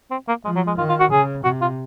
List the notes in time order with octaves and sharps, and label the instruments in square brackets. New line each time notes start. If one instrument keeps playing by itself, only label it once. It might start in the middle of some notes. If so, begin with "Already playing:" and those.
[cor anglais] C4
A#3
[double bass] F3 [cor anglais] G#3
[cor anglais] F#3
G#3
[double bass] D#3 [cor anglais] F4
[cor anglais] F4
F#4
[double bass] C#3 [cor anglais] G#4
[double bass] C3 [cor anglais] F#4
[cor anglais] F4